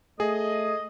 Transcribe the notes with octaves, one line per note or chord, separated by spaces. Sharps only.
A3 G#4 D#5